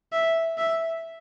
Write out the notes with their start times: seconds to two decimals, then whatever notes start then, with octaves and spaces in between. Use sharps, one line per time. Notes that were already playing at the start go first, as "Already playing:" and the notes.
0.13 E5
0.58 E5